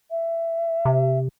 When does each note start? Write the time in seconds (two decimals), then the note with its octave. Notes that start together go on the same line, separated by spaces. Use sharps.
0.11 E5
0.85 C3